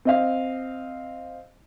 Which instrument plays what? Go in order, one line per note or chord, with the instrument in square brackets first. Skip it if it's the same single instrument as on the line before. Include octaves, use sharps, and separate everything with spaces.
[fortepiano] C4 D#5 F5